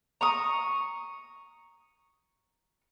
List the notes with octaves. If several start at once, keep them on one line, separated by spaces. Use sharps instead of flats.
A#5 C#6 D#6